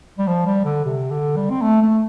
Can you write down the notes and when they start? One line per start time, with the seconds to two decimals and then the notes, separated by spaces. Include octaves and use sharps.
0.19 G3
0.27 F3
0.46 G3
0.65 D3
0.85 C3
1.11 D3
1.36 G3
1.50 C4
1.62 A3
1.81 A3